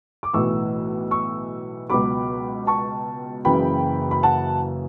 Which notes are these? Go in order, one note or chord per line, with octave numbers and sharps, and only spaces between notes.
D6
B1 A2 E3 C#6 E6
C#6 E6
C#2 B2 F#3 B5 D6
A5 C#6
F#1 F#2 C#3 E3 G5 B5
B5
F#5 A5